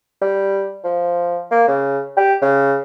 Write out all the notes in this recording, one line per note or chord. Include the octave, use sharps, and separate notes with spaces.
G3
F3
A#3
C#3
G4
C#3